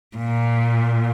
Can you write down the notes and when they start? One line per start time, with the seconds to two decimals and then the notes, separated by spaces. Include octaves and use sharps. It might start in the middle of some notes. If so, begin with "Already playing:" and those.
0.17 A#2